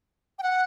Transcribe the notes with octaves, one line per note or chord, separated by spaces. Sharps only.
G5
F#5